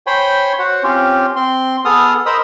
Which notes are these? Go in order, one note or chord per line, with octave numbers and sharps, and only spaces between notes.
C5 C#5 G5 G#5 B5 C6
F#4 C5 C#5 F#5
C4 C#4 F4 G4
C4 C6
B3 G#4 A4 D#6 F6
A#4 C5 D#5 B5 D#6 E6